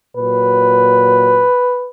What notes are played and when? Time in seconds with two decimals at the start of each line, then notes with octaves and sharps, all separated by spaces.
0.17 A#2 F#3 B4